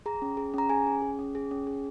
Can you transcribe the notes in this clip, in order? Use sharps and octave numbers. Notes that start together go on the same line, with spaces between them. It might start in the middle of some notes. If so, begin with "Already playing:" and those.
G#4 A#5
C#4
G#4
C#4 A#5
G#4 G#5
C#4
G#4
C#4
G#4
C#4
G#4